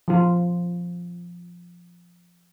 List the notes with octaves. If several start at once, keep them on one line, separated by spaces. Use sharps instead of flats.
F3 F4